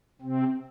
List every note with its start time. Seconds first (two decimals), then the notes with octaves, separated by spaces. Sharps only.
0.21 C3 C4